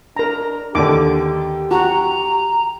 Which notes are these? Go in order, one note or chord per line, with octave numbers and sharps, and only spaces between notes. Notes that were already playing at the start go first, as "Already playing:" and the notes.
D4 A#4 A#5
D#2 D3 G4 D6
F#4 A#5